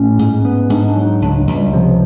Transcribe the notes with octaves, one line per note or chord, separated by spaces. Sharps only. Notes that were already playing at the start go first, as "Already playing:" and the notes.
Already playing: A2 C#4
G#2
B3
G#2 D4
D4
F#3
D#4
C#2 D4
G#3
C#2
G3
C3 F3